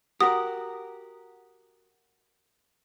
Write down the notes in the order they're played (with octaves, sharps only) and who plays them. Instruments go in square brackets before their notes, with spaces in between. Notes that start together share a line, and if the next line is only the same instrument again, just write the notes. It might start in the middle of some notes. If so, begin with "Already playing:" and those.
[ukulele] F#4 [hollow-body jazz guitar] G4 A#4 [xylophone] D#6